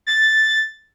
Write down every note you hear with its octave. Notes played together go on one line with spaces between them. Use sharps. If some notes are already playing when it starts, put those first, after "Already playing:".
A6